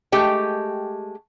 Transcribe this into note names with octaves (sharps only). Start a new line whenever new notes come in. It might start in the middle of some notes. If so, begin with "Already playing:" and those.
G#3 A3 G4 G5